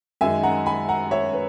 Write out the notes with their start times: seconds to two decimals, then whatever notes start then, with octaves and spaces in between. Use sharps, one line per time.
0.21 F#2 D#3 G#3 D#4 E5 G#5
0.43 F#5 A#5
0.66 G#5 B5
0.89 F#5 A#5
1.11 C#5 E5
1.33 B4